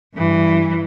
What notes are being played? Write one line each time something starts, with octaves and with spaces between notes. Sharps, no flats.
G2 E3